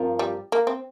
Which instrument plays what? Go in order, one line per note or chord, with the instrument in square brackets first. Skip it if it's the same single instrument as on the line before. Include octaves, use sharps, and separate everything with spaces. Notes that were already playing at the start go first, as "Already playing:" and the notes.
Already playing: [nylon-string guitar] G2 F3 C4 F4 A#4
[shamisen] G3
A#3
C4